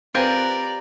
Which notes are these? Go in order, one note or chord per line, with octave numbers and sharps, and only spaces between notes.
C4 F4 G4 A#4 B4 D5 G#5